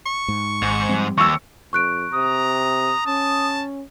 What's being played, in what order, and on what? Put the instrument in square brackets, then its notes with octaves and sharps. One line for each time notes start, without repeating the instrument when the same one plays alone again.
[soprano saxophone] C#6
[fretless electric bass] G#2
[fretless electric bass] G#1 [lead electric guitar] G#2
[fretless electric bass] F3 G3 C4
[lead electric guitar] D#2 [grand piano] C#6 E6
[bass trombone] F2 [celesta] C#6 F#6 D7
[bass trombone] C3 [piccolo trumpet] A#5 [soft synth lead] D#6
[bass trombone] C#4 [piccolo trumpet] A5